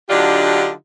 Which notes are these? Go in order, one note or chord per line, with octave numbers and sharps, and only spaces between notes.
D3 F#3 D4 D#4 F4 G4